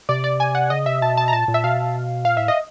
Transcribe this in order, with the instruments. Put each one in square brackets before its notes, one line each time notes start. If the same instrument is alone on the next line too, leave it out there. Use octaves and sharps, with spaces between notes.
[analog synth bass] C3 [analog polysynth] D5
[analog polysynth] D5
G#5
F#5
[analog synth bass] C#3 [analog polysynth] D#5
[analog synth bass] C3 [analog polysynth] E5
[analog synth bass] B2 [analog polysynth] A5
[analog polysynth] A5
A#5
[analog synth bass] A#2 [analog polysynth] A5
[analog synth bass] A#2
[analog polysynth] E5
[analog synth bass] B2 [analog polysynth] F5
[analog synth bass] A#2 [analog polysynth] F5
[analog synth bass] A2 [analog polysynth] E5
[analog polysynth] D#5